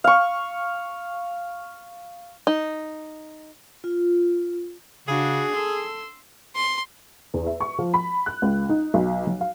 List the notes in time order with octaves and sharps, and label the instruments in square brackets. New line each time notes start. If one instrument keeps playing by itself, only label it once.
[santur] F5 C#6
[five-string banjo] D#4
[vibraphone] F4
[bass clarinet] C#3 [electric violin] D4 F#4 [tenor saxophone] G#4
[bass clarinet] A4 [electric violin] C6 E6
[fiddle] C6
[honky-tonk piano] E2
E5
C#6
F3
B5
F#6
C#2
D#4
B1
F#3
F5